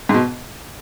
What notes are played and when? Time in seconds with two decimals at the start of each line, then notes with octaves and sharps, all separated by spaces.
0.09 G#2
0.14 B2